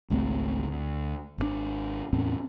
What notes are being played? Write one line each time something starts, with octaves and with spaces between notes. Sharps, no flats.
G#1 C#2 A3 C4
D2
G#1 B2 D4
E2 A2 C4 C#4